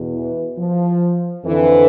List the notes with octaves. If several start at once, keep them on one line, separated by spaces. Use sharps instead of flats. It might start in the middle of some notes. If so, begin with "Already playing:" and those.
Already playing: E2 B2
E3
F3
F2 D3 E3